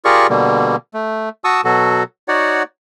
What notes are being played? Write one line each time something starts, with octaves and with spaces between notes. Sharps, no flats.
F4 G4 G#4 A#4 D5 C#6
B2 D3 G3 A#3
A3
F#4 A5 C#6 D#6 E6
B2 F#3 F#4 A4
D#4 F#4 C#5 D5 F#5